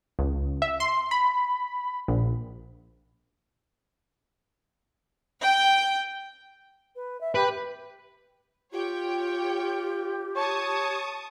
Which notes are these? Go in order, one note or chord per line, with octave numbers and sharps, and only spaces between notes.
C#2
E5
C6
B5
A#1
G5
B4
E5
G4 B4
F4 G4 C#5 G5
C#5 A5 C#6 D#6